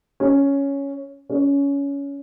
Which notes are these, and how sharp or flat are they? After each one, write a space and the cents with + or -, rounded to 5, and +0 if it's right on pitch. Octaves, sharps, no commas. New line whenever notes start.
C#4 +5
C#4 +20